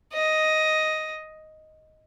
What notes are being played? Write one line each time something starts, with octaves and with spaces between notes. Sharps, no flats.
D#5